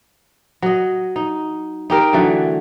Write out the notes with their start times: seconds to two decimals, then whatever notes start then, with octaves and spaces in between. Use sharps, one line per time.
0.62 F#3 D#5
1.16 D#4
1.90 D#4 G4 A#4 G5
2.13 D3 E3 F#3 A3